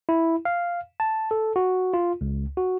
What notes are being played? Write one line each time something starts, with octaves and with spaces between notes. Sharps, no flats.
E4
F5
A5
A4
F#4
F4
C#2
F#4